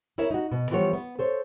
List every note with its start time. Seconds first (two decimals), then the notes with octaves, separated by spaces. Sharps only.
0.18 E4 A#4 C#5 E5
0.31 D#4 F#4
0.52 B2
0.71 E3 F3 G3 B3 C#5
0.93 B3
1.19 A4 C5 C#5